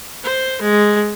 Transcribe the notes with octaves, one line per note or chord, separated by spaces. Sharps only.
C5
G#3